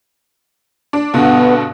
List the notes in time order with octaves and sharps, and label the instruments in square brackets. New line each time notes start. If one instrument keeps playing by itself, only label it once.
[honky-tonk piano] D4
[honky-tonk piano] G2 B2 D3 [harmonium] B3